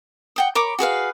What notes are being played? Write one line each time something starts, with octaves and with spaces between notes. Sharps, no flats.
F#5 G5 D#6
A#4 C#5 B5 D6
F#4 G#4 B4 F5